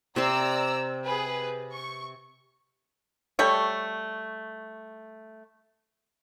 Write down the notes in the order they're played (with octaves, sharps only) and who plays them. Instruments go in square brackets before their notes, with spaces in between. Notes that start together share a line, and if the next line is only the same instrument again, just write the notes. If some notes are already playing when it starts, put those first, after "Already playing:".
[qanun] C3 C4 C6 [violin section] D5 A#5 E6
[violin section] G#4 B4
C#6
[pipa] G3 A3 C#5